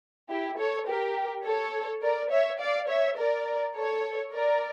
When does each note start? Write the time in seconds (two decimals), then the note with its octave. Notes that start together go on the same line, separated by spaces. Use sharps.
0.29 E4 G4
0.58 A4 C#5
0.87 G4 A#4
1.45 A4 C#5
2.02 A#4 D5
2.31 C#5 E5
2.59 D5 F5
2.88 C#5 E5
3.17 A#4 D5
3.75 A4 C#5
4.33 A#4 D5